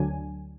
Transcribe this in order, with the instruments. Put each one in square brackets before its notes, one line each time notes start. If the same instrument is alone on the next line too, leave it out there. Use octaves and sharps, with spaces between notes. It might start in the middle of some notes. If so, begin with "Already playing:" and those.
Already playing: [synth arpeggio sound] D2 D3 F#3 D4 G#5